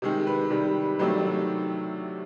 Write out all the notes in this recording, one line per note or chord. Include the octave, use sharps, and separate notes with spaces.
C3 D#3 G#3
B4
C3 D#3 G3
C3 D#3 F#3 A3 D4